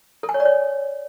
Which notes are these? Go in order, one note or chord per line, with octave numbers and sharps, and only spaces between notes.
A4
G#5
C#5
D5
C#5